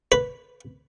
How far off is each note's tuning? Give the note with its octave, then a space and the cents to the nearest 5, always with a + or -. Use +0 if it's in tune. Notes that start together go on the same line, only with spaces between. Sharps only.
B4 +0